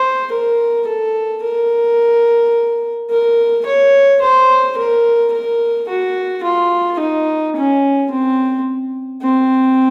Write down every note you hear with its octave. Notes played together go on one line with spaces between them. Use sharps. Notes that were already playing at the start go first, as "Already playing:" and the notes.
Already playing: C5
A#4
A4
A#4
A#4
C#5
C5
A#4
A#4
F#4
F4
D#4
C#4
C4
C4